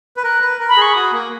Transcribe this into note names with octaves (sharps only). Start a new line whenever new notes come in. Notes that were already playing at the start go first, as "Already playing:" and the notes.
B4
A#4 F#6
B4
A#4
B5
G#4
C#6
F#4 D#6
A#3